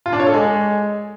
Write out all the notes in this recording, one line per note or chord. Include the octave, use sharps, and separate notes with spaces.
F4
D4
C#5
A4
G#3